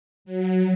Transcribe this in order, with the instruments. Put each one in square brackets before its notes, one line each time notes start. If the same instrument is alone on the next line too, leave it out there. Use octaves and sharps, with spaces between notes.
[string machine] F#3